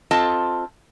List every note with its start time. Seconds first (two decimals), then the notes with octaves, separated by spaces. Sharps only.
0.11 C4 F4 A4 D#5 A5